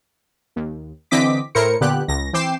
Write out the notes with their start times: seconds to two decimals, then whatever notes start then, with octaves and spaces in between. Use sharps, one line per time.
0.56 D#2
1.11 D3 E3 C4 D#5 D6 B6
1.55 A2 E4 A#4 C5 C#7
1.81 A#2 D3 B3 G4 F#6
2.08 C#2 A#6
2.33 E3 C4 G5 D6 C7 E7